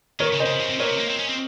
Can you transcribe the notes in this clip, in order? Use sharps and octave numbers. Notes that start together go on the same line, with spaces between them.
D#3 A#4 C#5
C#3
C5 D#5
C#3
C#3
C3
A#2 A#4 C#5
C3
A#3
C4
C#4
C4